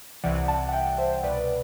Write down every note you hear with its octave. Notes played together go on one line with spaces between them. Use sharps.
C2 C3 E3 D5 F#5
F#5 A5
F#5
E5 G5
C5 E5
C2 B2 B4 D5